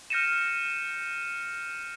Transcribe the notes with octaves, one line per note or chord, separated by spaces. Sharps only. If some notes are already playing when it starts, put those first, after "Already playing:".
F6 G6 A#6 C#7 D#7 E7